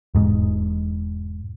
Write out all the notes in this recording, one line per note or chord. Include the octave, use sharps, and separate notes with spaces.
E1 G#2